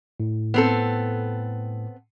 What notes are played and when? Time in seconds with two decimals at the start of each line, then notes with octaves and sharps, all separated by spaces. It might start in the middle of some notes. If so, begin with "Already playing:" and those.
0.20 A2
0.54 B3 C4 A4